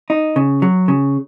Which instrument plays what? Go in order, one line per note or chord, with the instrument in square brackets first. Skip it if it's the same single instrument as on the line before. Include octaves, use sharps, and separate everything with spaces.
[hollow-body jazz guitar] D#4
C#3
F#3
C#3